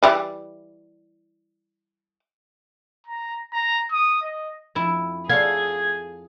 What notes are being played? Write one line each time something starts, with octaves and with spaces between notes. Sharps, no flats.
E3 G3 E4
A#5
A#5
D#6
D#5
F2 E4
G#4 A4 C#5 F5 G#6